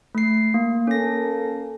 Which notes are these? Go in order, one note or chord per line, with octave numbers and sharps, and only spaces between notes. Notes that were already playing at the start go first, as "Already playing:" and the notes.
A3 C7
A#3
A#3 C#4 A4 A#6